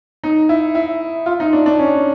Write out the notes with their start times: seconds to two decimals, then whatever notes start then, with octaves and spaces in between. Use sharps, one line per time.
0.23 D#4
0.49 E4
0.75 E4
1.26 F4
1.40 D#4
1.53 D4
1.66 D4
1.79 C#4